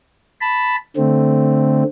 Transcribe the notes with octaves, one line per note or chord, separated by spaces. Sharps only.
A5 B5
D3 A3 C4